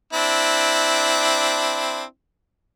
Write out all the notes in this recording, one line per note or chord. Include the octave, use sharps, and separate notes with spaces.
C4 D4 E4